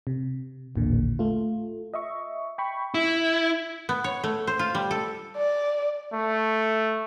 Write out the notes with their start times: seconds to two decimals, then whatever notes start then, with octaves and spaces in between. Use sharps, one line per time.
0.07 C3
0.76 A1 D#2 A#2 D3
1.19 A3 F4
1.94 D#5 E5 C#6
2.58 G5 B5 C#6
2.94 E4
3.89 B3
4.04 C#5
4.24 A3
4.47 C5
4.59 F4
4.75 G3
4.91 A4
5.37 D5
6.14 A3